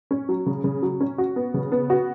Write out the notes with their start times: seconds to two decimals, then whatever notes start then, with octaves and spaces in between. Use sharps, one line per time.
0.11 C#4
0.29 F#3
0.46 C#3
0.64 C#3
0.82 F#3
1.00 C#4
1.18 F#4
1.36 B3
1.54 C#3
1.72 B3
1.90 F#4